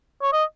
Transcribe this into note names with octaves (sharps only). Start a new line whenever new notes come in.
C#5
D#5